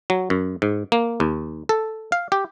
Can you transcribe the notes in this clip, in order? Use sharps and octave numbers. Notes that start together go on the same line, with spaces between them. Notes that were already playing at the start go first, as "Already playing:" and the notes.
F#3
F#2
G#2
A#3
D#2
A4
F5
G4